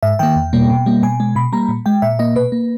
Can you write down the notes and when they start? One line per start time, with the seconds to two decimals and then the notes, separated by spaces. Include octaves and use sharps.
0.03 G#2 E5
0.19 D#3 A#3 G5
0.36 E2
0.53 B2 G3 A#3
0.70 B2
0.86 G3 A#3
1.03 B2 G#5
1.20 G#3
1.36 B2 B5
1.53 G3 A#3 A#5
1.69 A#2
1.86 G#3 G5
2.02 A#2 E5
2.19 A#3 D#5
2.36 B2 B4
2.52 A#3